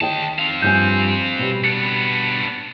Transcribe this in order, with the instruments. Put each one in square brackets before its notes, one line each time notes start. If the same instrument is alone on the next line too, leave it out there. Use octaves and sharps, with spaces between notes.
[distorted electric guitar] D2 A5 [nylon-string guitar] D#3 D#5 G5
[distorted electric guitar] C4 F5
[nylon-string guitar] G2 F3 G#5 [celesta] G6
[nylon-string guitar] B2 G3
[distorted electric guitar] B3 D4 [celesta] C#7